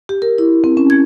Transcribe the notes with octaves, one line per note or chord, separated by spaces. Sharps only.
G4
A#4
E4
C4
C#4
G#6